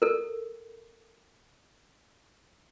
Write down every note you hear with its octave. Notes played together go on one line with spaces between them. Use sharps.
A4 A#4